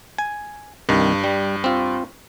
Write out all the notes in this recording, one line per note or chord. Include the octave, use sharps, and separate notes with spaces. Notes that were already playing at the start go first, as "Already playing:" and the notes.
G#5
C2 G2 D#3
G3
C4 F4